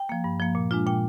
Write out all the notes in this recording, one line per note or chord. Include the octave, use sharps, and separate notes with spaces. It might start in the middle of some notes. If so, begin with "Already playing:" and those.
Already playing: G5
F3 A#3
G2
F3 A#3
A#2
G#3 D4 F4
A#2 G5